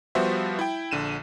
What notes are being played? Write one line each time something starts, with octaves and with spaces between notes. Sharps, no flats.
F3 G3 B3 F#4 C5 E5
E4 G5
A#1 D3 D#7 E7